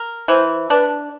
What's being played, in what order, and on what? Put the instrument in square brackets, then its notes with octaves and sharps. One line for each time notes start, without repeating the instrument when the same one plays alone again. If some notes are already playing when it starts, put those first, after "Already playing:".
Already playing: [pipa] A#4
[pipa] E3 [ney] C5
[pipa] D4 [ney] B4